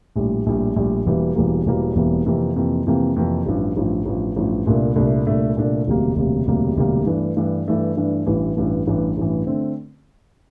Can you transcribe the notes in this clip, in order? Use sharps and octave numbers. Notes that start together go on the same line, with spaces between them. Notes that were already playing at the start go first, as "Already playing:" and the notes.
A#1 A2 G3
A#1 A2 G3
A#1 A2 G3
E1 E2 E3 G3 A#3
E1 E2 E3 G3 A#3
E1 E2 E3 G3 A#3
E1 E2 E3 G3 A#3
F2 C3 E3 A#3
F2 C3 E3 A#3
F2 C3 E3 A#3
F2 C3 E3 A#3
A1 G2 F3
A1 G2 F3
A1 G2 F3
A1 G2 F3
C2 A#2 A3 D4
C2 A#2 A3 D4
C2 A#2 A3 D4
C2 A#2 A3 D4
E1 D2 C3 G3 A#3
E1 D2 C3 G3 A#3
E1 D2 C3 G3 A#3
E1 D2 C3 G3 A#3
G2 E3 A3 D4
G2 E3 A3 D4
G2 E3 A3 D4
G2 E3 A3 D4
A1 G2 E3
A1 G2 E3
A1 G2 E3
A1 G2 E3
D3 A3 C4